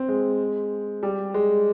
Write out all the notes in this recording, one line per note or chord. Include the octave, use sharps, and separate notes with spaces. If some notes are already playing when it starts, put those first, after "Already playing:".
Already playing: C4
G#3
G3
G#3